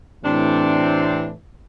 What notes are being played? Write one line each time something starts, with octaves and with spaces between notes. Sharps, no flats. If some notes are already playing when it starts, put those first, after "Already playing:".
A2 C3 E3 C4 D4